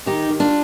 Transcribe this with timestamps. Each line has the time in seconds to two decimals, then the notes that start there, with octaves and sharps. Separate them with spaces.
0.06 D#3 D#4 G4
0.29 D#3
0.40 D4 F4